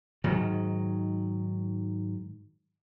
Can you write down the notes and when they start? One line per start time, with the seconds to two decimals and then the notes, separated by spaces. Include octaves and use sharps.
0.24 G#2 D#3 F#3